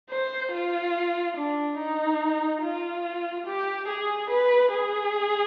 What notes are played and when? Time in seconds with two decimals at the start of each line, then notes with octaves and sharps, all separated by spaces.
0.10 C5
0.52 F4
1.36 D4
1.79 D#4
2.62 F4
3.46 G4
3.88 G#4
4.30 B4
4.72 G#4